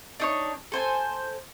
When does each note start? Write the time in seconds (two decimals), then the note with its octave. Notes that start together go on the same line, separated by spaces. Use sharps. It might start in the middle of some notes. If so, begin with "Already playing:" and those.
0.20 D4 D#4 C#5
0.72 A4 C5 G#5